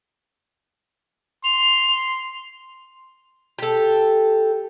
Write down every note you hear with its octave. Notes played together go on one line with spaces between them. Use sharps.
C6 F7
G4 A4